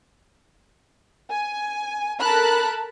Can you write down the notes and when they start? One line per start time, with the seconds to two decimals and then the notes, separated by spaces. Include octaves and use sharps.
1.29 G#5
2.19 A4 A#4 A5 B5 F#6